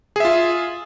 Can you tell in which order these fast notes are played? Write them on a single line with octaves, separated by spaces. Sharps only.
G#4 E5 F4